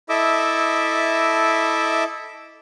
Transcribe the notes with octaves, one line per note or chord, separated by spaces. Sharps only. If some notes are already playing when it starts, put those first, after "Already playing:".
E4 A4 D#5 E5 D6 E6